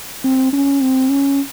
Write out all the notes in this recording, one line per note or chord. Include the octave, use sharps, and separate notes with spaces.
C4
C#4
C4
C#4